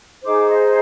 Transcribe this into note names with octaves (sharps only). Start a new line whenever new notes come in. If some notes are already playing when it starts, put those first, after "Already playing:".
D#4 G#4 C5 D6
D#5